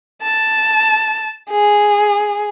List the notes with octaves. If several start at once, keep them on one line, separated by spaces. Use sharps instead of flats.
A5
G#4